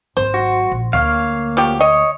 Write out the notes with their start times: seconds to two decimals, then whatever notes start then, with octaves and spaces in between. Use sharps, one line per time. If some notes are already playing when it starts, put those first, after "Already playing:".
0.17 G#1 F#3 C5
0.34 F#4
0.72 A#1
0.93 D2 A#3 C#5 F5
1.57 F3 F#3 G4
1.81 C#5 D#5